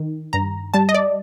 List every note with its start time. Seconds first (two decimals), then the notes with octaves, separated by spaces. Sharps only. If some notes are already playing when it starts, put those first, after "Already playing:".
Already playing: D#3
0.33 G2 A#5
0.74 G3 A5
0.89 D#5
0.94 D5